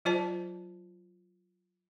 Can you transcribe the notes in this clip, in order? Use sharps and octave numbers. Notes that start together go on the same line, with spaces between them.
F#3 F4 C5 D5 A5